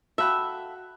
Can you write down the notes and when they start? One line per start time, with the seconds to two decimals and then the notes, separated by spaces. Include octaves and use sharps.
0.18 F#4 A4 E5 F5 G5 B5 F#6